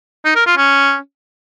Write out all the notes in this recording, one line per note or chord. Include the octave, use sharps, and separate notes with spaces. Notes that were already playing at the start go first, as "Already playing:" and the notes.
D#4
A#4
F4
C#4